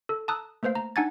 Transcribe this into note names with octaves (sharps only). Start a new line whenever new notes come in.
A4
A5 A#5 D#6 E6 F#6
A3 A#3 B4 C5 F5
A#5
D4 D#4 F#5 G#5 G#6 A6